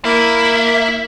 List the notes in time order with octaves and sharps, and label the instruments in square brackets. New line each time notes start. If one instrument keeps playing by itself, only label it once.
[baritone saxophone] A#3 [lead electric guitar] E4